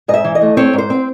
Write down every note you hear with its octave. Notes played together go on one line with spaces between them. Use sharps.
G#2 D#5
E5
E3
D#5
A3
C4 C#5
G#2 C5
C4